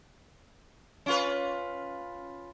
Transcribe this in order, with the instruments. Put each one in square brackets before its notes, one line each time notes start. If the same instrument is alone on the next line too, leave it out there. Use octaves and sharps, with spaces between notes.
[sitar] C#4 F4 B4